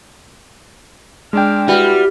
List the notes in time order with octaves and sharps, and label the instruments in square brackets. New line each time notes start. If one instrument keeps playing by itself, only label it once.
[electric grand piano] G#3 G5 [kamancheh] D4 F6
[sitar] G3 [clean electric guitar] E4 F#4 B4 [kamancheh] F6